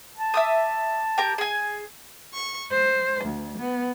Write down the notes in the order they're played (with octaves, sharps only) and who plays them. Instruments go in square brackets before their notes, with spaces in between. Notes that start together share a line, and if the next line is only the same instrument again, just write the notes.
[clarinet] A5
[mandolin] E5 D6 D#6
G4 A#4
G#4 G#5
[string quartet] C#6
C5
D2
B3